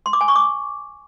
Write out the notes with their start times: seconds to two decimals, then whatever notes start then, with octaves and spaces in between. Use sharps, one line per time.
0.06 C6
0.13 D6
0.21 G#5
0.28 C#6
0.36 D6